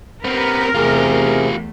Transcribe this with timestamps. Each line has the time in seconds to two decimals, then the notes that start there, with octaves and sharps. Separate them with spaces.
0.25 B3 C4 G4 A#4 B4
0.75 E2 C3 A3 F4 G4 G#4